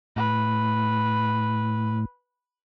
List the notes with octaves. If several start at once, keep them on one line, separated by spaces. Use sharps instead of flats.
A2 B4